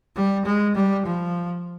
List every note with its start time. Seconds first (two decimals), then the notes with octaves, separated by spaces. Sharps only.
0.16 G3
0.46 G#3
0.75 G3
1.06 F3